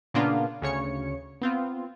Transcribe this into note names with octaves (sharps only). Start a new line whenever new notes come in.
A#2 C#3 A#3 B3 D4 F4
D2 C#3 C#5 C#7
B3 C4 F4